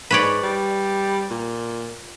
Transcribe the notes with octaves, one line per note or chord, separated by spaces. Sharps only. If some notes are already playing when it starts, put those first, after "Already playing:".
G#2 B4 C#5 D5
G3
A#2